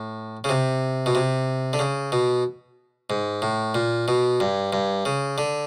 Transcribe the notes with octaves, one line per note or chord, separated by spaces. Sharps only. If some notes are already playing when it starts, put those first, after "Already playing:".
Already playing: A2
C#3
C3
B2
C3
D3
C#3
B2
G#2
A2
A#2
B2
G2
G2
C#3
D3